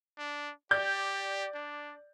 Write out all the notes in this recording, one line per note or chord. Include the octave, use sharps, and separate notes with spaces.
D4
G4 D5 G6
D4